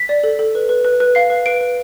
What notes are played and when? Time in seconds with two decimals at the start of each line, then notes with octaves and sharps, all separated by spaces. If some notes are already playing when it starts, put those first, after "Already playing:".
Already playing: B6
0.09 D5
0.23 A4
0.39 A4
0.55 B4
0.69 B4
0.85 B4
1.00 B4
1.15 F5 C7
1.30 B4
1.46 B4 D7
1.61 B4